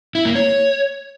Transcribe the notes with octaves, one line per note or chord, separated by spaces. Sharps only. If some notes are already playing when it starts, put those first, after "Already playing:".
E4
A#3
C#5